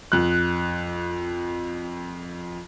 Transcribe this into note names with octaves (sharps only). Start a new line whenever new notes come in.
F2 F#6